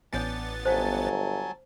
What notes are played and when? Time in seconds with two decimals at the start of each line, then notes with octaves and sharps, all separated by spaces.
0.13 A1 B3 D4 C#5 F#5 G#5 A6
0.65 G1 F#3 C5 F5 G#5 A5